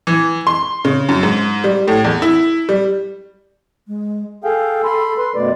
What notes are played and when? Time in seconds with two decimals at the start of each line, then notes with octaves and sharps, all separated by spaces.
0.07 E3
0.47 C6
0.85 C#3
1.09 F#2
1.23 G#2
1.64 G3
1.88 A2
2.04 E2
2.22 E4
2.69 G3
3.88 G#3
4.44 G#4 A4 F5 G5
4.84 B5 C6
5.18 B4 C6
5.35 F#2 B2 A3 D5